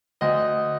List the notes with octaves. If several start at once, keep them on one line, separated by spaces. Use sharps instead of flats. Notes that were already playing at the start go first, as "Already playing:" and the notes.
D2 D#5